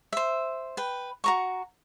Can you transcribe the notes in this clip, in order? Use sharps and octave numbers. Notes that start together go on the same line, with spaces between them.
C5 E5
B4 G5
F#4 A#5 C#6